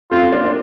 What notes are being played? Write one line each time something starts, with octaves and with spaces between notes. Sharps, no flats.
A3 C4 F4
C4
A#3 D4
D4